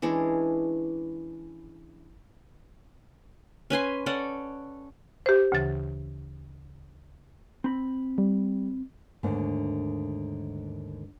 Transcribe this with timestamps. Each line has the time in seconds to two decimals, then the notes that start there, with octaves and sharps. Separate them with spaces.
0.02 E3 G#3 C#4 D4
3.70 C#4 B4 G#5 C6
4.06 C#4 A4 D5 F#5
5.26 G4 C5
5.52 D2 C#3 E3 A6
7.64 C4 B5
8.18 G3
9.23 D#2 G#2 D3 A3 A#3